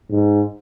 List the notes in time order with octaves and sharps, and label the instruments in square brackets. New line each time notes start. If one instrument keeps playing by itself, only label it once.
[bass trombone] G#2